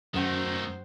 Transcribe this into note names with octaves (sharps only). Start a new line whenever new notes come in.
F#2 D#3 F#3 A3 F#4 C5 G5